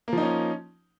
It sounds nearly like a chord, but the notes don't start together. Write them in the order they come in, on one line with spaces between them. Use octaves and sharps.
A#3 F3 D#4 C#4